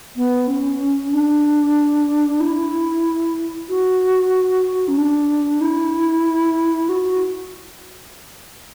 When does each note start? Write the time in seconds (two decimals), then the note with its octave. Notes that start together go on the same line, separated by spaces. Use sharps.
0.16 B3
0.47 C#4
1.12 D4
2.40 E4
3.69 F#4
4.88 C#4
4.98 D4
5.61 E4
6.89 F#4